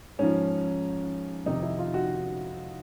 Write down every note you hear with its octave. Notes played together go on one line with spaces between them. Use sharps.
G#2 F3 C#4
F2 C3 D#3 D#4
E4
F4
F#4